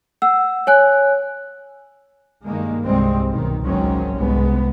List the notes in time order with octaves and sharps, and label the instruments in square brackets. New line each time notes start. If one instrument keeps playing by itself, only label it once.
[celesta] F#5 E6
C#5 G#5 F#6
[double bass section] G2 D#3 G#3 A#3
C2 G2 G3 G#3 C4
B1 D#3
G#1 C#2 D#3 F#3 C4 C#4
C2 G#2 G#3 B3